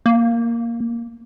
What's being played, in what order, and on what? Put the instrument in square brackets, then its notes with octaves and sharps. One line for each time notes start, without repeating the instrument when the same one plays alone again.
[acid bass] A#3